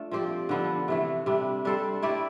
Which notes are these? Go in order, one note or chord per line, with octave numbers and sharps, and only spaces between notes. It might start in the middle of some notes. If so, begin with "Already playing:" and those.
Already playing: A3 D4 F4
F3 C4 G4 D5
D3 F3 B3 D4
C3 E3 A3
C3 G3 D4
G3 D4 A4 C5
A3 E4 G4 D5